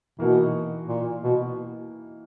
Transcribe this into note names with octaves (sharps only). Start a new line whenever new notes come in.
B2 E3 A#3 D#4 F#4
A#2
B2